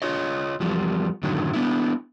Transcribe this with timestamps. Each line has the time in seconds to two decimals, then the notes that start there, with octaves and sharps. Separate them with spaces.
0.02 F4 C#5 D#5
0.60 E2 F3 G3
1.23 F#2 A2 D3 D#3 F#3
1.53 B3 D4 E4